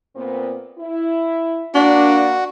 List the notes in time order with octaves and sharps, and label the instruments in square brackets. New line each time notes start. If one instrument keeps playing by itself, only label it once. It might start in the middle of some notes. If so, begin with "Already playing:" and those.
[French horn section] A#2 B3 C4
E4
[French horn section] A#3 D5 [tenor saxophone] D4 [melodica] F#4